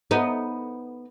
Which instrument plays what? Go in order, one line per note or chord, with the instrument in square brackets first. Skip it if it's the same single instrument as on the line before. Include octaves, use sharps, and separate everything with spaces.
[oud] B3 D#4